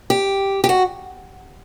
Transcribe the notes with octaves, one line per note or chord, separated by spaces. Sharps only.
G4
G4
F#4